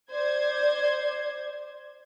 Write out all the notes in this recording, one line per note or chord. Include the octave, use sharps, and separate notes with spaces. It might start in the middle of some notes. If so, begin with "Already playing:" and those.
C5 D5 G#6